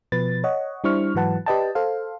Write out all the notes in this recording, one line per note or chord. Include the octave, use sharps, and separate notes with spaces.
B2 F3 B4 A6
C#5 D#5 F#5
G3 D4 E4 C5 C#6 F6
G#2 E3 F#3 B4 F#5 A5
G4 B4 D5 D#5 G5 A5
A4 C5 F5